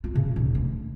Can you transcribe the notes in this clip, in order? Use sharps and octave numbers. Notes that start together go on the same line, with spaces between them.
F4
C#3
D#1
D2